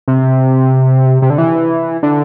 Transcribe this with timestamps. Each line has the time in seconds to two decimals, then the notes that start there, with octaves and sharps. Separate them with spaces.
0.08 C3
1.22 C3
1.30 D3
1.38 E3
2.03 D3